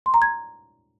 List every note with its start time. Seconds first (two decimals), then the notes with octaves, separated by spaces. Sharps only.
0.06 C6
0.14 A#5
0.22 G#6